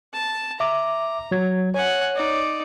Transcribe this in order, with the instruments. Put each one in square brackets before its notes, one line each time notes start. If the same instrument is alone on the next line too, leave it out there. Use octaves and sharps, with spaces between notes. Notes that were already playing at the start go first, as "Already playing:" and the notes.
[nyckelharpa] A5
[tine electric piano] E5 D6 [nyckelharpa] A#5
[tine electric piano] F#3 G#6
[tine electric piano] C#5 [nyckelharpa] F#5 G#5
[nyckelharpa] D#4 D5